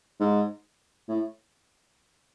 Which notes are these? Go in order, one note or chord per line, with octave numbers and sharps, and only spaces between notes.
G#2
A2